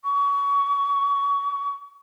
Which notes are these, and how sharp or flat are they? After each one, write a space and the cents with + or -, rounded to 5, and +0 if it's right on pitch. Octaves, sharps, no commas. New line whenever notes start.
C#6 +25